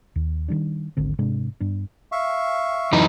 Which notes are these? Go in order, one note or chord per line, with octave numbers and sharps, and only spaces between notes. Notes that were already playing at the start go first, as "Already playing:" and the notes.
D#2
D#3 G3 D4
D1 G#1 D3 C4
G#2 C3 G#3 D4
G2 B3 D4
E5 F5 C#6
F#2 E3 D#4